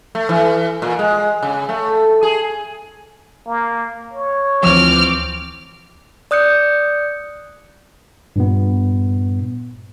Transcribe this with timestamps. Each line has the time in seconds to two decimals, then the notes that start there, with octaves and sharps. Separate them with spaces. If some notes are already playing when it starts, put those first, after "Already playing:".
0.15 A3
0.29 E3
0.82 A#2
0.99 G#3
1.43 C#3
1.69 A3
2.23 G#4
3.48 A#3
4.13 C#5
4.63 D2 E3 F3 C4 D6 F6
6.31 D5 D#6 F#6 G6 C#7
8.36 G2 A#2 B3